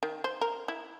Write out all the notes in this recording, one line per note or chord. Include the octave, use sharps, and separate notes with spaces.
D#3
C5
A#4
E4